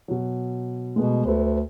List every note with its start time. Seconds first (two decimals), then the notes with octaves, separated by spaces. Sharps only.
0.08 B2 F#3
0.96 B2 G#3 A3 B3
1.26 D2 A4 B4 C5